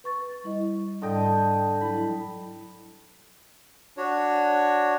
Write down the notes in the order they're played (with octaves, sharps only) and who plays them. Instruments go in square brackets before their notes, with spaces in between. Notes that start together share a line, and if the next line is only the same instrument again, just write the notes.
[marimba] B4 C#6 A6
G3 E4 D#5
[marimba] G#2 G3 D5 [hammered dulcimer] D3 D#5 G5
[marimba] F#3 E4 [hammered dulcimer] B5
[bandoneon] D4 F#4 C#5